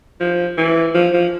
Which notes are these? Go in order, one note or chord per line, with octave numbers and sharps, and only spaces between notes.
F3
E3
F3
F3